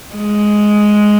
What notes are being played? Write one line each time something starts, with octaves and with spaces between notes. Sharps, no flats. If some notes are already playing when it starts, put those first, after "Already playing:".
G#3